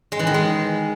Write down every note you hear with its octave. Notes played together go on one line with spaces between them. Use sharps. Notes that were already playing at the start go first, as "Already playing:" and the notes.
G#3
E3
D#3
G#3